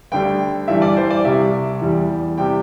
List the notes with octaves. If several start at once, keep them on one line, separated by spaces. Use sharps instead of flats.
D2 D3 G3 G5
G2 E3 G3 E5
D5
C5
D5
C2 C3 G3 E5
E2 E3 G3
C3 G3 G5